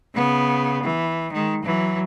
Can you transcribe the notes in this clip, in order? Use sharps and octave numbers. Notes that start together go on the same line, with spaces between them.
C#3 B3
E3
D#3 G#3
E3 F#3